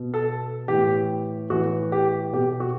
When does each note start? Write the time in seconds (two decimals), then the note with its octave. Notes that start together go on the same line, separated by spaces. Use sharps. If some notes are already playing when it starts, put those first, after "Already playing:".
Already playing: B2
0.14 A4
0.68 A2 E3 G4
1.50 A2 E3 F#4
1.92 G4
2.33 B2 G4
2.60 F#4